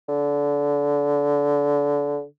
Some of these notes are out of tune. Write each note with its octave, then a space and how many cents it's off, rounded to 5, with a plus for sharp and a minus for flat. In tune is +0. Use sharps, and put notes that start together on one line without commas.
D3 -25